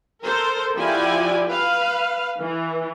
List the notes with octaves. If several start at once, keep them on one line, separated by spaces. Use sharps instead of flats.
A4 A#4 C5
F3 E4 F#4 G4 D5 G#5
B4 F5
E3